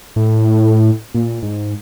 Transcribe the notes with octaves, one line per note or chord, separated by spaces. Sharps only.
A2
A#2
G#2